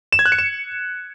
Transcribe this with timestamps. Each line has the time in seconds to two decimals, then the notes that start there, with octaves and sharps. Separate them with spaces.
0.13 E7
0.19 G#6
0.26 F#6
0.32 C#7
0.39 E7